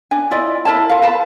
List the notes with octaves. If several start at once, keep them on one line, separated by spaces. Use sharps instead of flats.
D4 G#5
E4 F4 D5 D#5
E4 A#4 C#5 A5
F4 A#4 F5
B4 A5 B5